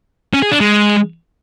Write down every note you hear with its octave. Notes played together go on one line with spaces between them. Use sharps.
C#4
G#4
D4
G#3